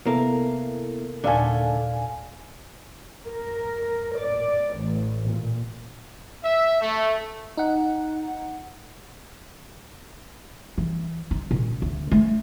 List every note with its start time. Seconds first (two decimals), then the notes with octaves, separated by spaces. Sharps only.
0.06 C3 A#3 B3 E4 A4
1.24 D#2 A#2 D3 A3 D5 F5 G#5
3.25 A#4
4.15 D5
4.75 A1
5.30 A#2
6.43 E5
6.81 A3
7.57 D#4 F#5
10.78 E3
11.31 D#4
11.51 A#2
11.82 D2
12.11 A3